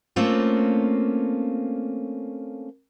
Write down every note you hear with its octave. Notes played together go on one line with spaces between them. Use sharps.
A3 A#3 C4 C#4 F4